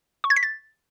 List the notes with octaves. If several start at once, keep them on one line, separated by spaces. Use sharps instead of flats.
C#6
G#6
B6
A6